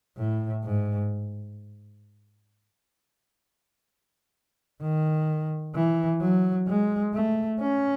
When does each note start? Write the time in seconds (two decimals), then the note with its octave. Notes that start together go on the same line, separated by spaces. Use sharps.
0.17 A2
0.64 G#2
4.82 D#3
5.75 E3
6.21 F#3
6.68 G#3
7.14 A3
7.61 C#4